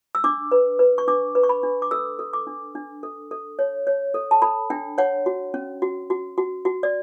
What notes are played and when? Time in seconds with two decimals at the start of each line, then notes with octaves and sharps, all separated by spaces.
0.15 E6
0.24 D4 D6
0.52 B4
0.79 B4
0.98 C#6
1.08 D4 D6
1.35 B4
1.43 C#6
1.49 B5
1.63 D4
1.82 D6
1.91 A4 E6
2.19 A4
2.33 D6
2.47 D4
2.75 D4
3.03 A4
3.31 A4
3.59 C#5
3.87 C#5
4.14 A4
4.31 A5
4.42 A4 B5
4.70 D4 G5
4.98 C#5 F#5
5.26 F#4
5.54 C#4
5.82 F#4
6.10 F#4
6.38 F#4
6.65 F#4
6.83 D5